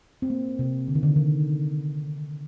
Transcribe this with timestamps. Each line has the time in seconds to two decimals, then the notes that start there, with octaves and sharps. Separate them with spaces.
0.22 C4
0.30 A#3
0.59 C3
0.88 D3
0.95 D#3
1.03 D3
1.16 D#3